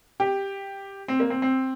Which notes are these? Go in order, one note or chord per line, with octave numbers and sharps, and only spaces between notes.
G4
C4
A#3
C4
C4